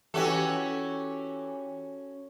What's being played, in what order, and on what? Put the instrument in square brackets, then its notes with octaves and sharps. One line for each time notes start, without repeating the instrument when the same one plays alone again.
[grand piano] E3 G4 [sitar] C#4 F#4 A4